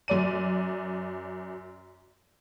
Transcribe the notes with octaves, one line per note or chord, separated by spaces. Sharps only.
F#2 D5 D#7